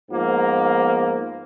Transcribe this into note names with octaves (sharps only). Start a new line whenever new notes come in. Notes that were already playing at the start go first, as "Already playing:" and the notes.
G#2 F3 A#3 B3